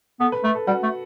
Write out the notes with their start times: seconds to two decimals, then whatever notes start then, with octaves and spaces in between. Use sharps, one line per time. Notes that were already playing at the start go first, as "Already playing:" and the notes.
0.20 B3 A4
0.32 B4
0.44 A3 B4
0.55 A4
0.67 G3 F#4
0.83 A3